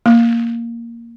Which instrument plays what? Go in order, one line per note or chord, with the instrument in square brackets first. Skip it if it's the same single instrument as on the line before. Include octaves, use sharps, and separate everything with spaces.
[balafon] A#3